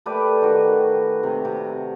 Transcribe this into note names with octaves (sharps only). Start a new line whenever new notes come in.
A3 G4 B4 D5
D#3 F#4
F#4
C3
C3